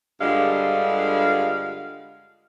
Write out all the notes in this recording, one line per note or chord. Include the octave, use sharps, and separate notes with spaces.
G2 D3 G3 G#3 F4 F5